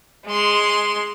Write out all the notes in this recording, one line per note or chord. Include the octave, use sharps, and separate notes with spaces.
G#3 C6